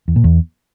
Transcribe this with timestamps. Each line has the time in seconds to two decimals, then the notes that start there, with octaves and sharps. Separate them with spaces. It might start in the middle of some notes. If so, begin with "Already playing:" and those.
0.08 E2
0.16 A#2
0.24 E2